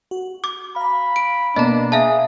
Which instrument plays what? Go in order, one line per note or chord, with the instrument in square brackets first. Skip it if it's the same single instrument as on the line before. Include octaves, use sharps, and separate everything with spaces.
[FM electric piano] F#4
[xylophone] D6
[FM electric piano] F5 A#5 [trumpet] B5
[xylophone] D7
[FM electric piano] B2 A#3 B3 [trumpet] D4 [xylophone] D#5 A#5
[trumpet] G#4 [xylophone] E5 F5 A5